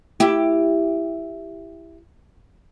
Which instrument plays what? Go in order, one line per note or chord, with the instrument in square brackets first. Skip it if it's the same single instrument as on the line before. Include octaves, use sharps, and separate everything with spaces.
[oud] E4 G4